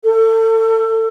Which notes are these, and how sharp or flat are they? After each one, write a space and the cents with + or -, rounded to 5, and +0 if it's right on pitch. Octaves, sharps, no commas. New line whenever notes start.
A4 +30